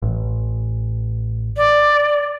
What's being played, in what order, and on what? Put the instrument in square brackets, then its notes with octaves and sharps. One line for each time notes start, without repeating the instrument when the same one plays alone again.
[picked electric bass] A1
[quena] D5